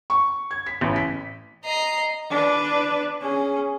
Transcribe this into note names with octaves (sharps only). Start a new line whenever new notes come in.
C#6
G#6
B6
A1
B6
D#5 A#5 C7
D4 B4
C#4 G#4